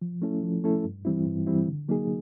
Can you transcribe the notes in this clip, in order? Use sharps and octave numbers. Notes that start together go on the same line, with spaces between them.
F3
A3 C#4 E4 A4
F3
A3 C#4 E4 A4
G2
E3 G3 C4 E4
G2
E3 G3 C4 E4
D3
F#3 A#3 D#4 G#4